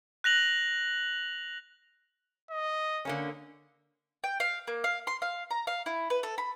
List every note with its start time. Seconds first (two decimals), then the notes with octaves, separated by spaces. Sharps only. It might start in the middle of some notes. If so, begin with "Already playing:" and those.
0.24 F#6 A#6 F7 F#7
2.51 D#5
3.05 D3 A#3 C#4
4.24 G5
4.40 F5
4.67 A#3
4.84 F5
5.07 C6
5.22 F5
5.51 A#5
5.67 F5
5.86 E4
6.10 B4
6.23 A4
6.38 B5